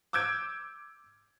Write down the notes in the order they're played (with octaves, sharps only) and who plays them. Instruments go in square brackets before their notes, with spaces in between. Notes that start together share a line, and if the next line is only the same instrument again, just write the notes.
[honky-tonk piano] D6 E6 G6 G#6 D7